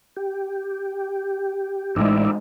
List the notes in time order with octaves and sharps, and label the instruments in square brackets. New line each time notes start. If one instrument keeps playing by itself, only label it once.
[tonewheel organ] G4
[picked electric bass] A1 A2 G#3 [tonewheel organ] D#4 D5 E5